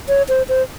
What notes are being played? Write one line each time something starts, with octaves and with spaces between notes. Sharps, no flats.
C#5
C5
C5